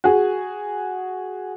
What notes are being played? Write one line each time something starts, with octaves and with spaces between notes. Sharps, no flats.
F#4 G#4